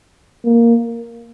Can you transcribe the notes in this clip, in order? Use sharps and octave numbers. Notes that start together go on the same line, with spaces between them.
A#3